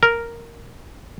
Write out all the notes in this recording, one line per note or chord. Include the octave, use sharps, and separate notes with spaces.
A#4